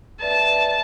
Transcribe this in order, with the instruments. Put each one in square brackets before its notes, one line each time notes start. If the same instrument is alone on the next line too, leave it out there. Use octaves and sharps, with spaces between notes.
[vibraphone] B4 D5 E5 [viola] A5